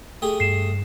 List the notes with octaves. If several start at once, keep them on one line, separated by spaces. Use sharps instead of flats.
A3 G4 G#4
G2 C7 E7